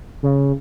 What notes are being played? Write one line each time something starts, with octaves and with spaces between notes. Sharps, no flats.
C#3